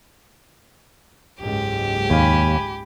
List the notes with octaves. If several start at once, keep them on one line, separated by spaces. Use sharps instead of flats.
F#1 C#2 G#2 G4
D#2 F5 G#5 B5